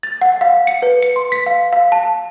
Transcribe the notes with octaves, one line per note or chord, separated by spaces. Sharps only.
A6
F#5
F5
C#7
B4
C#7
C6
B6
F5
F5
A5